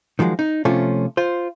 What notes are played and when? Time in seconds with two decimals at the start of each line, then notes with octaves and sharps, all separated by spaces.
0.19 D#3 F3 F#3 G#3
0.39 D#4
0.65 C3 F3 A3 C#4 F4
1.17 F4 C5